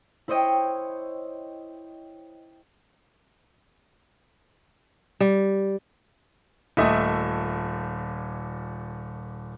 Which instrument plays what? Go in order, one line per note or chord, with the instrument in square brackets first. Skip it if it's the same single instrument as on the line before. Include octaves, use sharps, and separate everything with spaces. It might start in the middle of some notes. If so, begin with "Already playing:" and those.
[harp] E4 C5 C#5 D#5 G5
[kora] G3
[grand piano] D#1 A#2 A3 D#5 E5 D#6